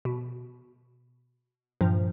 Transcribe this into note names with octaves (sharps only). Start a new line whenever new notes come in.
B2
G2 A#2 F3